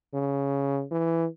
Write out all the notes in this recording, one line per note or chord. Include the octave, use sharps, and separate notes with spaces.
C#3
E3